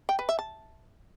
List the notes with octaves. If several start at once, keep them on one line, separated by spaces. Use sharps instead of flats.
G5
B4
E5
A5